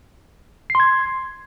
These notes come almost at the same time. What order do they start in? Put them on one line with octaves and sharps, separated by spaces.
C7 C6 G#6